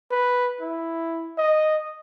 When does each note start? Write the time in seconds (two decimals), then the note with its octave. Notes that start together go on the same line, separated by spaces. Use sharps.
0.11 B4
0.61 E4
1.38 D#5